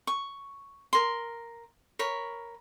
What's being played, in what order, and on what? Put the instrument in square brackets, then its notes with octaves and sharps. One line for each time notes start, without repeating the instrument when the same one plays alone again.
[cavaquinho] C#6
A#4 C6
A#4 C#5 B5